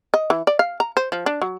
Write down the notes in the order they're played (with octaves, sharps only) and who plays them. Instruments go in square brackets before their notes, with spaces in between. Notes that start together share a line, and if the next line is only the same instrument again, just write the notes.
[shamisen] D#5
E3
D5
F5
A#5
C5
F3
D4
F#3